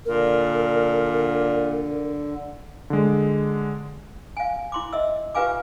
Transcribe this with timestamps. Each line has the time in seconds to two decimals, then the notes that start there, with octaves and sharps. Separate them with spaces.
0.05 A#2 D3 A#4
2.90 D3 G#3
4.37 F5 G#5
4.72 E4 C6 D6
4.93 D#5 E5 E6
5.35 F4 G4 B4 F5 G#5 D6